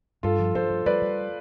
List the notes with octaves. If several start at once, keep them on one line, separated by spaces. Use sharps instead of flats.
G2 F4 A4
F3
G2 A4 C5
F3
G3 B4 D5
G3